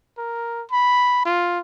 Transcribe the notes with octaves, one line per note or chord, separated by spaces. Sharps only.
A#4
B5
F4